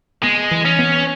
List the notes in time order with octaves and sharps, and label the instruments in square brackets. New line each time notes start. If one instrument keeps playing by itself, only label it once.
[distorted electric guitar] G#3 [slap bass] B3
[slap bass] E3
[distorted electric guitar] C#4
[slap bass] B3